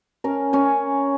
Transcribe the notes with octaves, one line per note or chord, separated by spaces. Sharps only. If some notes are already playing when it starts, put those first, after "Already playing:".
C#4 A#4
C#4 C#5 G#5